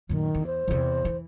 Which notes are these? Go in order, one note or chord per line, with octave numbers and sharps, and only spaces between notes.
F#2 A#2 D#3
E2
C5
E2 C3
E3